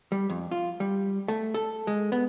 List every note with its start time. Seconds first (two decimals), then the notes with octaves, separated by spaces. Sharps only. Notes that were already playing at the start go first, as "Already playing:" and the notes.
0.12 G3
0.30 F2
0.51 F4
0.80 G3
1.28 A3
1.54 A4
1.87 G#3
2.12 B3